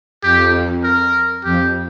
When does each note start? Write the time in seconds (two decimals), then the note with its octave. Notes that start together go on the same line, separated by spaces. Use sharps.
0.23 F2 G4
0.84 A#4
1.44 F2 G4